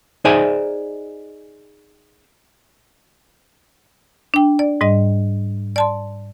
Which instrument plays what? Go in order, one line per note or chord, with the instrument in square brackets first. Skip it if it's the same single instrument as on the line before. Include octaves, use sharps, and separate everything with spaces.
[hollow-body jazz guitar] D#4 G#4 C5 D5 E5 G#5
[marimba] D4 G5
D5
G#2 G3 D#5
D5 A5 C6